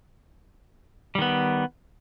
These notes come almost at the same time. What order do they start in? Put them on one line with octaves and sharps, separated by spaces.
G3 D#3 B3